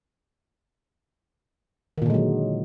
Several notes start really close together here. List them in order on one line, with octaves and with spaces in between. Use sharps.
D#3 A#2 D3 G#3 F#3